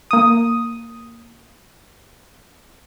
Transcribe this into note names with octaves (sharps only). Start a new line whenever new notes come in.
A#3 D#6